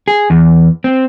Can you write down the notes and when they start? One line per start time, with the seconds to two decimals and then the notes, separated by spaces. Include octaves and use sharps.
0.08 G#4
0.30 E2
0.84 C4